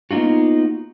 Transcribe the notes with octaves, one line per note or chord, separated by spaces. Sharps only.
A#3 B3 D#4 F4 F#4